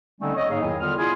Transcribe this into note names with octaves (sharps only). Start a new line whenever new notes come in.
D3 G3 A3 C4 C#4 D#4
C#5 D#5
G#2 A#3 G#4 C#5 F5
E2 D#3 F#3 E4 G#5
D3 G3 B3 F4 F6
E4 F4 G#4